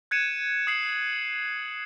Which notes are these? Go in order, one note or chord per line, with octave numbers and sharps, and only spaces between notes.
F#6 G#6 C#7 D#7 E7
D#6 C7 F#7